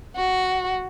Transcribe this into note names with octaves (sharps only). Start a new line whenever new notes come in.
F#4